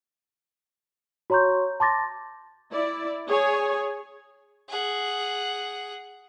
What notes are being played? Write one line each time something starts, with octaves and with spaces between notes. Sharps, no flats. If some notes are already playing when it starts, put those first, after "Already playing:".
F#4 C#5 A#5 C6 C#6 G6
A5 C6 D6 A6 A#6
E4 D5
G#4 C#5 G#5
G#4 F#5